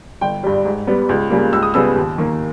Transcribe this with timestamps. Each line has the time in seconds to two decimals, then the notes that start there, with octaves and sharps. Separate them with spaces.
0.21 G1 G5
0.43 G2 G3
0.65 G#2
0.87 G3 B3
1.09 C#2
1.30 C#3 G3 A#3
1.53 C#2 E6
1.63 D#6
1.74 C#3 G3 B3 E6
1.96 D#2
2.18 D#3 A#3